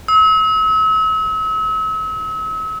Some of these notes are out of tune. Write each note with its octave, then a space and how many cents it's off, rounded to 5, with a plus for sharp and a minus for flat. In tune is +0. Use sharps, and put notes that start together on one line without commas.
E6 -40